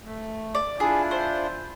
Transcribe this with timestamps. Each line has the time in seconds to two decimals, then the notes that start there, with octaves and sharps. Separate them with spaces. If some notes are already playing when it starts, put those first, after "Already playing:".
0.05 A3
0.55 D5
0.80 D4 E4 F4 G#4
1.11 C5